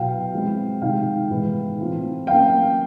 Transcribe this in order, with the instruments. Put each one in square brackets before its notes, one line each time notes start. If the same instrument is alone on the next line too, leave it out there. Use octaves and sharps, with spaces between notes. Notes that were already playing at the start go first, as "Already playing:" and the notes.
Already playing: [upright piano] B2 F#3 B3 E4 F5 G5
F3 G#3 C4 E4
C3 D#3 G#3 F5 G5
A2 E3 G#3 B3 D#4
E3 A3 C4 F4
F#3 A#3 C#4 F5 G5